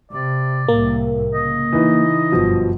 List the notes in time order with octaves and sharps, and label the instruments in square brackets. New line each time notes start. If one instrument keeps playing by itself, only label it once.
[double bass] C3 [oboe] D5
[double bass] C2 A2 [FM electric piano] A#3
[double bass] C#3 [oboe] D#5
[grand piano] E3 D#4 B4
[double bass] G1 F#2 [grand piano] B2 F3